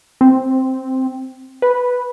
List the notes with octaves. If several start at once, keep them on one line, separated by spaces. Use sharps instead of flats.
C4
B4